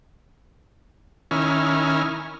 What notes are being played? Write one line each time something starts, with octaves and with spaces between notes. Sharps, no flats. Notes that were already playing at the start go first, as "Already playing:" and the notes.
D#3 C#4 E4 F6